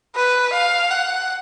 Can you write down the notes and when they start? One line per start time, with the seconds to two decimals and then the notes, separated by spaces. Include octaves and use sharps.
0.15 B4
0.53 F5
0.91 F#5